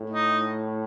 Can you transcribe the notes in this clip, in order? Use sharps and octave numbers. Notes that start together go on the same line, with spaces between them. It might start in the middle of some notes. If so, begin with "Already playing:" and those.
Already playing: A2
D#4